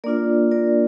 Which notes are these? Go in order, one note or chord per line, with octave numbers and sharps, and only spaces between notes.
A#3 D4 F4 A#4 D5
A#4 D5